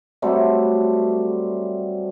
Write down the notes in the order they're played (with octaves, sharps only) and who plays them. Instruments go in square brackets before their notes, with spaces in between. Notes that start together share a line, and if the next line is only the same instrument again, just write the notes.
[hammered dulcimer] F#3 G3 A3 C4